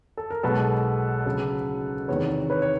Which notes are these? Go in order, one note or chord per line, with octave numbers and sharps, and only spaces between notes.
A4
A#4
B1 B2 G#3 A4 B4
D2 C#3 F#3
E2 C3 D#3 B4 C#5
B4 C#5
C#5